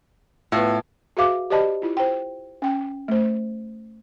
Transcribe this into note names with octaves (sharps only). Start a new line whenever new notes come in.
A2 B3 F4
F#4 G#4 B4 E5 F5 D6
G4 C5 D5 D#5 A5 B5
E4 F4
C5 G5
C#4 G5
A3 C5